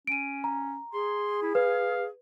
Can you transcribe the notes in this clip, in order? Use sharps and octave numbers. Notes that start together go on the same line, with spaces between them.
C#4 D7 D#7
A#5
G#4 C6
E4
B4 F5